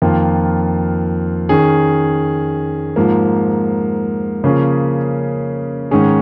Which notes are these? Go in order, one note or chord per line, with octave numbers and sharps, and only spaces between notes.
F2 D#3 A#3 F4
D#3 C#4 G#4
G#2 F3 A#3
C#3 F3 A#3 C#4 G#4
G#2 D#3 C#4 G#4